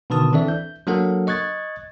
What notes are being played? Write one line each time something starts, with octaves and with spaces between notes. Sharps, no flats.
B2 D3 D#3 B4 A5 D#6
E3 C4 D4 A4 D5 E5
G6
F#3 A#3 D4 A4 A#4 F#5
D#5 C#6 F#6 G#6 A6